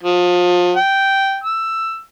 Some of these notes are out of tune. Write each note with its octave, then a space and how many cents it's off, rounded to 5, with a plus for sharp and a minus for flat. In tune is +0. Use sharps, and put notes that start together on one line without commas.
F3 +30
G5 -10
E6 +10